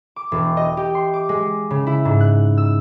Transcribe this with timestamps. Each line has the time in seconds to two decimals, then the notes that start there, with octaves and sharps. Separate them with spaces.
0.16 D6
0.32 E1
0.57 D#5
0.77 G4
0.95 C6
1.14 D6
1.29 G#3
1.71 C#3
1.87 E4
2.05 G#2
2.21 F#6
2.57 E6